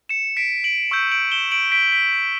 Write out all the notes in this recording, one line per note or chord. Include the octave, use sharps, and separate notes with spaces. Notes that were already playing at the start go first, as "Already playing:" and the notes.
C#7 E7
B6 D7
D7 F#7
C#6 E6 G6
D7 F#7
E7 G7
D7 F#7
B6 D7
B6 D7